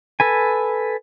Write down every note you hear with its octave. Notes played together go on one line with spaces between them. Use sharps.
A4 B4 G#5